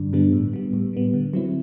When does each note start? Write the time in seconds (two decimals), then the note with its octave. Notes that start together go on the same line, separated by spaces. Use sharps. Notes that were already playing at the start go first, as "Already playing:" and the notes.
Already playing: G2 D3 G3 D4
0.13 D3 G3 B3 D4
0.33 A2
0.53 G3 B3
0.73 A2
0.93 G3 B3
1.14 D3
1.34 F#3 C4 E4